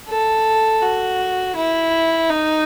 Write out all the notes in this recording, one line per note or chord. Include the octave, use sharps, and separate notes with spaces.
A4
F#4
E4
D#4